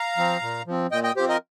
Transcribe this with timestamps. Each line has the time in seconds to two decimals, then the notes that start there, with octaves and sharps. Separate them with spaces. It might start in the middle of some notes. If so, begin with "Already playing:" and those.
Already playing: F5 A#5
0.17 F3 C4
0.42 A#2
0.67 F3 C4
0.92 A#2 D#5 G5
1.04 D#5 G5
1.16 F3 C4 G4 C5
1.29 A#4 D#5